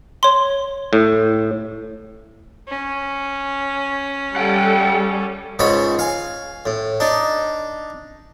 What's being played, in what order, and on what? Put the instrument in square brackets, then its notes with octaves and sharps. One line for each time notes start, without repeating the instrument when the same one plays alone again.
[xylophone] C#5 C6
[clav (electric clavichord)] A2
[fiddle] C#4
[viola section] G3 A4 [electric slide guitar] F#5 G5
[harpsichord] C#2 G#2 C#3 C#5 B5
F5 G#5
A2
D4 D#4